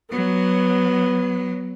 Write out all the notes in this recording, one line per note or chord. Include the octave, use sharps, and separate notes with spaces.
F#3 B3